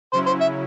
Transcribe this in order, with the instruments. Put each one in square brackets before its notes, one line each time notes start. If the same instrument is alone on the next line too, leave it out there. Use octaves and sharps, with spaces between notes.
[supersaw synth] C#3 F#3 C#4 E4 [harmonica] C5
[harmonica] C5
E5